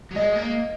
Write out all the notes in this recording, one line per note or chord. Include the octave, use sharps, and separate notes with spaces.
F#3
G#3 D#5
A#3